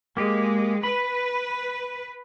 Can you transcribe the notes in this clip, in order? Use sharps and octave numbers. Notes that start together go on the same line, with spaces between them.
G#3 A#3 G4
B4 B5